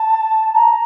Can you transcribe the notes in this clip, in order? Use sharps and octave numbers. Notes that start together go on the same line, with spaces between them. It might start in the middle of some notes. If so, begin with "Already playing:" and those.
Already playing: A5
A#5